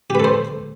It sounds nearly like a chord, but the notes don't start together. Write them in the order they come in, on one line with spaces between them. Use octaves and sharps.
G4 B4 A4 C5